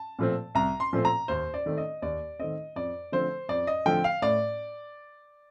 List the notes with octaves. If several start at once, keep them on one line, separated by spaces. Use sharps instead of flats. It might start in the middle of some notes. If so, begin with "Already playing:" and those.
Already playing: A5
A#2 F3 A3 C4
C2 A#5
C6
A#2 F3 A3 C4
A#5
D#2 C5
D5
D#3 A3 C4
D#5
D#2 D5
D#3 A3 C4 D#5
F2 D5
D3 F3 A3 C4 C5
F2 D5
D#5
D3 F3 A3 C4 G5
F5
A2 D5